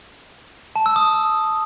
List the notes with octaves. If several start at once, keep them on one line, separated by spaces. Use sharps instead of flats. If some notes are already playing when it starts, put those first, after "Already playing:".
A5
E6
D#6